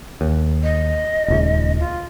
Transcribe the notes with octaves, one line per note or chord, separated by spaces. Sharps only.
D#2
D#5
D#1 C#2
F4